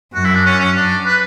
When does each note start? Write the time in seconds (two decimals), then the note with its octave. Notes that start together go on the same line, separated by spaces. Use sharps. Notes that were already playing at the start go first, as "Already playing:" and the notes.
0.14 F#2 F#4
0.24 E4
0.35 D4
0.45 C#4
0.60 C#4
0.75 D4
1.05 B4